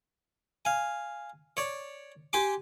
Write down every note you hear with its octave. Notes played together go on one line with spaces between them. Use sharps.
F5 G#5
C#5 D5
G4 G#5 C6 D6